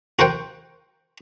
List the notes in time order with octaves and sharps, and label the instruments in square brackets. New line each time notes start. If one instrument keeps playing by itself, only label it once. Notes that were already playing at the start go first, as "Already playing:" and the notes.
[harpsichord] F#4 A#4 C5 F#5 G5